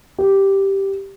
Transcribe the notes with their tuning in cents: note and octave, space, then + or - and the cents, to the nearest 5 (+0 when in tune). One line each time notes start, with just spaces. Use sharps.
G4 -5